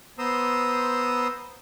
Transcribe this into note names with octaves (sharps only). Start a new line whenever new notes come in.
B3 C5 A#5 C6 D#6 E6